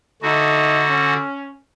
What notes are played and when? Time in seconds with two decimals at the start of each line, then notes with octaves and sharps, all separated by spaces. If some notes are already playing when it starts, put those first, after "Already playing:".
0.22 D3 A3 D#4 F#4
0.88 C#4